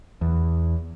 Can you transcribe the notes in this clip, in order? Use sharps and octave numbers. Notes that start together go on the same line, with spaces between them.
E2